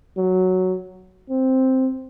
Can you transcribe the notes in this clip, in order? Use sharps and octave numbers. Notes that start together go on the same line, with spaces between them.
F#3
C4